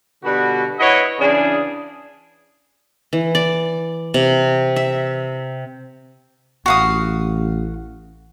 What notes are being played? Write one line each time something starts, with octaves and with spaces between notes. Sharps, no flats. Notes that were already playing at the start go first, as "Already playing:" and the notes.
B2 D3 G3 F#4
E4 B4 C#5 D#5 F#5
C#3 E3 D4 G#4
E3
D5
C3
E5
A1 F#4 F5 D#6